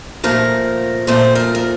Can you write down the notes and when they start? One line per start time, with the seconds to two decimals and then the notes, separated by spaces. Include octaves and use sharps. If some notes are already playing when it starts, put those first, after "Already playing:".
0.24 A#2 F3 A3 A#4
1.07 A#2 F3 A3 C5
1.35 A#4
1.55 A#4